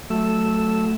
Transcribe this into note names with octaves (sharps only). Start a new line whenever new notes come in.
F#3 A3 A4 E6